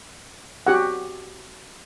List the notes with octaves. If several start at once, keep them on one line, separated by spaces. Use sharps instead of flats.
F#4 G4 F#5